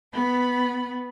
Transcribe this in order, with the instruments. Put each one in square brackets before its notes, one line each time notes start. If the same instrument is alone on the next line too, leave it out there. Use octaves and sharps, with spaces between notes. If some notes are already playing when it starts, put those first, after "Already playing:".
[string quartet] B3 B5